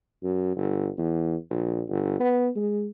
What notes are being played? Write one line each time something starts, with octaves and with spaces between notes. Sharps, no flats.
F#2
G1
E2
A#1
G1
B3
G#3